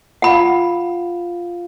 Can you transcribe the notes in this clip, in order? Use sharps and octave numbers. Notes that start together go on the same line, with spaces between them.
F4 F5 F#5 B5